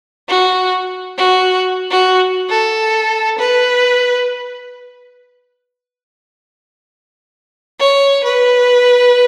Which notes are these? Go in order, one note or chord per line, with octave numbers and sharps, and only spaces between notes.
F#4
F#4
F#4
A4
B4
C#5
B4